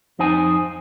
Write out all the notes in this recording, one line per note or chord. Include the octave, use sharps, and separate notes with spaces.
F2 D#4 C5 G#5